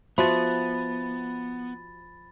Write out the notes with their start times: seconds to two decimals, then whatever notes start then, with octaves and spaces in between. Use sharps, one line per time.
0.18 F3 B3 F#4 E5 B5 A6